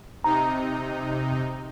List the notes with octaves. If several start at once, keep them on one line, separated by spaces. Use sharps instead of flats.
C3 D#4 A#5